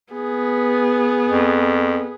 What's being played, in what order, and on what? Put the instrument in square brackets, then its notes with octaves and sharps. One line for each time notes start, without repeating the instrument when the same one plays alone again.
[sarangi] B3 [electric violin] G#4
[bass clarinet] F2